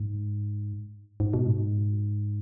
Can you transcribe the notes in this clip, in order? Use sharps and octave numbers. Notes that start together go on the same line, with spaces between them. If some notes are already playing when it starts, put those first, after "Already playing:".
Already playing: G#2
G#2
B2
G#2